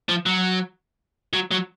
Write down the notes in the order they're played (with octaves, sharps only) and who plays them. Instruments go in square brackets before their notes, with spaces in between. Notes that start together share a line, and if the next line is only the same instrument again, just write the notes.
[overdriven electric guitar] F3
F#3
F#3
F#3